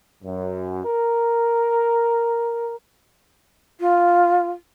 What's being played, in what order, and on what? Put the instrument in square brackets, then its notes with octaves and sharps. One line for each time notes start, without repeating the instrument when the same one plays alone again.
[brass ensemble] F#2
A#4
[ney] F4